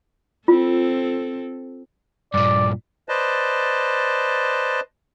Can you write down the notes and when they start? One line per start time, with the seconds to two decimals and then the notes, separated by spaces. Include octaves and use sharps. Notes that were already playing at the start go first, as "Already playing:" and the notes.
0.48 C4 F4 A4
2.34 G2 A#2 D5
3.09 B4 C5 D5 D#5 A5